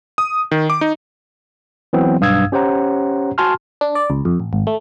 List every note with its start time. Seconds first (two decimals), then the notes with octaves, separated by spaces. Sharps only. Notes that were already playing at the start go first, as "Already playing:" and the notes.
0.18 D#6
0.51 D#3
0.70 D6
0.81 D#4
1.93 E3 F#3 B3 C4
2.21 B1 G2 F5 D#6 E6 G#6
2.52 C#4 G4 C5 C#5 F#5 A#5
3.38 F#4 G#5 A5 C6 F6
3.81 D4
3.95 D5
4.10 C#2
4.25 F2
4.40 A1
4.53 G#1
4.67 A3